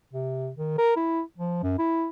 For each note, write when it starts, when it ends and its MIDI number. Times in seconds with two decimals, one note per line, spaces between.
0.13 0.50 48
0.56 0.76 51
0.78 0.93 70
0.96 1.21 64
1.38 1.59 53
1.63 1.78 42
1.79 2.09 64